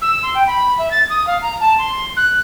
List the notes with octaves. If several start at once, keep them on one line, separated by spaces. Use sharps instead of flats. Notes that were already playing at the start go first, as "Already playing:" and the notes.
E6
C6
G5
B5
E5
A6
D#6
F5
A#5
A5
C6
F#6